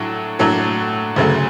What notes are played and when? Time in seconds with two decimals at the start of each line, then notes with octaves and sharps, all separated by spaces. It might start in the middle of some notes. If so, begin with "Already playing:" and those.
Already playing: A2 F#3 A3 D4
0.39 A2 F#3 A3 D4
1.16 D2 C#3 F#3 A3